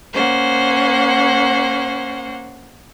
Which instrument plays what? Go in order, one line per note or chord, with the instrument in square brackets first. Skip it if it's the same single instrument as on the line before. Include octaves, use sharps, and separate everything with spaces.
[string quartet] A#3 C#4 C5 F#5